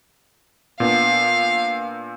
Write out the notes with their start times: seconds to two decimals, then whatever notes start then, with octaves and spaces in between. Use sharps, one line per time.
0.80 A#2 B3 D4 F5